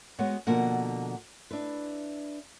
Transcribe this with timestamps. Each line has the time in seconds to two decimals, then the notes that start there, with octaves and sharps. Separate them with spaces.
0.19 G#3 B3 F#4 C#5 F#5
0.47 B2 D3 F3 A#3 F#5
1.51 D4 E4 B4